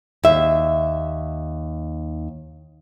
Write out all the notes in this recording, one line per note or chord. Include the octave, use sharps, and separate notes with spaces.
D#2 E5